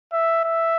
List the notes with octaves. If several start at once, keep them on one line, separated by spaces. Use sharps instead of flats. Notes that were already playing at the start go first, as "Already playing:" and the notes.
E5
E5